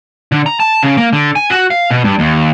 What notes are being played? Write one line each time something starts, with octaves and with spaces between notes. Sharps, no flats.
D3
A#5
A5
C#3
A#3
D3
G#5
F#4
F5
B2
G2
D#2